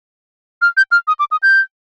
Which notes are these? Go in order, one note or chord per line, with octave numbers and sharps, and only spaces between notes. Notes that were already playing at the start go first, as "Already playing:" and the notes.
F6
G6
F6
D#6
D6
D#6
G6